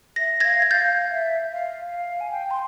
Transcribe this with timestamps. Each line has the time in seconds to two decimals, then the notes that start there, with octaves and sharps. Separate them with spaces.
0.16 E5 A#6
0.40 F5 G#6 A#6
0.62 G#6
0.70 F5 G6 A6
1.10 E5
1.52 F5
1.90 F5
2.20 G#5
2.31 G5
2.51 C6